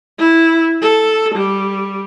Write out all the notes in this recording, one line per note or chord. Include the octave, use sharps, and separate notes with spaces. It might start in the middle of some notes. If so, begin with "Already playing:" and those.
E4
A4
G3